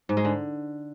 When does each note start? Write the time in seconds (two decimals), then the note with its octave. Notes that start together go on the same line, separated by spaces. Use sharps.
0.09 G#2
0.17 G#3
0.25 D3